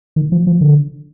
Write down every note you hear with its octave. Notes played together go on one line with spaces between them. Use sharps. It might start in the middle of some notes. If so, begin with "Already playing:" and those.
D#3
F3
F3
D3